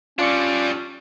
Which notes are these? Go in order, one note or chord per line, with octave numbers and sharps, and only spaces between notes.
G3 C#4 D4 F4 D5 C#7